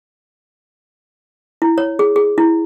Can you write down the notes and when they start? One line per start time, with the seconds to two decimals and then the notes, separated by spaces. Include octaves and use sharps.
1.62 E4
1.78 C#5
1.99 G#4
2.16 G#4
2.38 E4